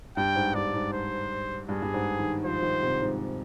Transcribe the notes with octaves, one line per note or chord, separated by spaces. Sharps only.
G2 G5
G#2
G2 D5
G#2
C5
G2 G#4
G2
G#2
D#3
F3 C5
D#3
C3
G#2